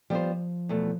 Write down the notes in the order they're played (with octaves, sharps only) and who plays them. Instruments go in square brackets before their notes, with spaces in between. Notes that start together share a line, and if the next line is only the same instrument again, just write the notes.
[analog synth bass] F3 [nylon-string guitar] G3 B3 F4 C5
[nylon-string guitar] E2 B2 A3